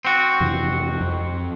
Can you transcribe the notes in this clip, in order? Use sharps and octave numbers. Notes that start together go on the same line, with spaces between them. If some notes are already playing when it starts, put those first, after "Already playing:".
C4 F#4
F2 C3 E3
F2